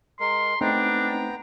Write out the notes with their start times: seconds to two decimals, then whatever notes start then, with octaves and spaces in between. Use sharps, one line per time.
0.20 G#3 A#4 C6
0.61 A3 B3 C4 D4 D#4 G5 A#5